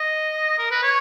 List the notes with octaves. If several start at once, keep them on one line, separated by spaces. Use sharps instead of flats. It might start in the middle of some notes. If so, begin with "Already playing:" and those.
Already playing: D#5
A#4
B4
C#5